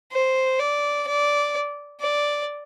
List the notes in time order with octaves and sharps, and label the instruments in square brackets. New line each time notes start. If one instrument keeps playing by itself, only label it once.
[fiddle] C5
D5
D5
D5